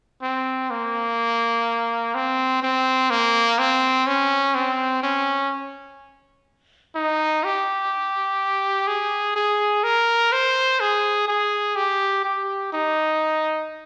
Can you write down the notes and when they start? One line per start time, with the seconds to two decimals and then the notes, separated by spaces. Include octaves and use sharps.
0.22 C4
0.70 A#3
2.15 C4
2.63 C4
3.10 A#3
3.59 C4
4.07 C#4
4.55 C4
5.03 C#4
6.95 D#4
7.44 G4
8.87 G#4
9.36 G#4
9.83 A#4
10.33 C5
10.80 G#4
11.28 G#4
11.76 G4
12.24 G4
12.73 D#4